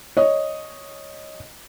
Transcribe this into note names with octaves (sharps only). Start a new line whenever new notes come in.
C#5 D#5